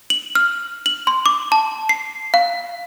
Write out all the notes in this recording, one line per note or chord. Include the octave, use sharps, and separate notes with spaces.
F#7
F6
F#7
C6
D6
A5
C7
F5